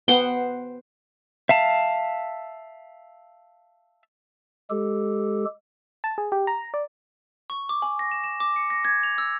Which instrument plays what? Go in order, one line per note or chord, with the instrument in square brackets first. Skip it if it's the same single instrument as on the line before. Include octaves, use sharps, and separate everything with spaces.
[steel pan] B3 [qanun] C5 F#5 G5
[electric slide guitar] E5 F5 A5
[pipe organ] G#3 G4 A4
[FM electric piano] A5
G#4
G4
A#5
D5
[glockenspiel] C#6
D6
G#5
A#6
E7
E7
D6
C#7
A#6
G#6
F7
E6